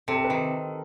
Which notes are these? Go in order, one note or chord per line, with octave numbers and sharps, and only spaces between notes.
C3 A4
A4
B4
D#3